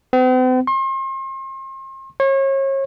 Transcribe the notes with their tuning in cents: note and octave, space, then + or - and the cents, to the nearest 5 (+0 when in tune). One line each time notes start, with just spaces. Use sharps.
C4 -45
C6 +40
C#5 -35